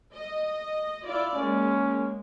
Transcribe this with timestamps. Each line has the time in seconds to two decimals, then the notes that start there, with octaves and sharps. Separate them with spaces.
0.14 D#5
1.05 E4 F4 D5
1.35 G#3 A#3 C#4